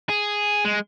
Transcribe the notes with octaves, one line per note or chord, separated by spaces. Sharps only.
G#4
G#3